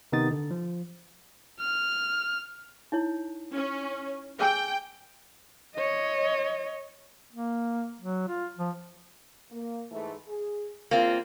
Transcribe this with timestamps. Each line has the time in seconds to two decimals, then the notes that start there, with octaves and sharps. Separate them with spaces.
0.12 C3 D#3 B3 D#4 D#6 A6
0.31 D3
0.51 F3
1.60 F6
2.92 D#4 E4 C#5
3.54 C#4
4.40 G#4 G5 G#5 E6
5.75 C#5 D#5
7.32 A#3
8.01 F#3
8.28 F4
8.59 F3
9.51 A#3
9.91 G#2 E3 A3
10.27 G#4
10.91 E2 A#3 C4 F4